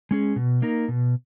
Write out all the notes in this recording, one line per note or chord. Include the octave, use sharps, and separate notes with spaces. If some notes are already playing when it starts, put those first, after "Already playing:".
G#3 C#4 G#4
B2
A#3 D#4 A#4
B2